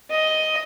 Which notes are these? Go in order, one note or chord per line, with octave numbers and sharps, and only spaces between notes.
D#5